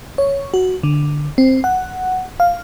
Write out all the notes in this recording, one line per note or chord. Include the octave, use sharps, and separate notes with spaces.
C#5
F#4
D3
C4
F#5
F5